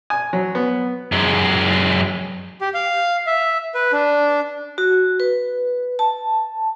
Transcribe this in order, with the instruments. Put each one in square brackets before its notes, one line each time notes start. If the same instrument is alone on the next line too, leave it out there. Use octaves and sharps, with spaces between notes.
[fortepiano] G#5
F#3
B3
[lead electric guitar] F#2 G#3
[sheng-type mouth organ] G4
F5
E5
B4
D4
[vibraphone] F#4
B4
A5